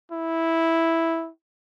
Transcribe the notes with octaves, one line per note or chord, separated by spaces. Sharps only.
E4